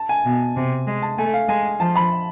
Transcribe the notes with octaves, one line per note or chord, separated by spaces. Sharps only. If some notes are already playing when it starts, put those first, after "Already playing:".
Already playing: A5
G#5
B2
C3
G#3
A5
A3 G#5
F5
G#3 G#5
F3 A5
B5